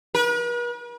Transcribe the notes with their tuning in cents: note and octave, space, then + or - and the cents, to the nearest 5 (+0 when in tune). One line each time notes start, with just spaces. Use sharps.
B4 -45